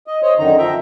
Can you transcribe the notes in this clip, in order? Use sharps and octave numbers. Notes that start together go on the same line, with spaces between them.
D#5
C5 C#5 D#5
F#2 D3 D#3 D#4 A#5
F3 E5 G5 A#5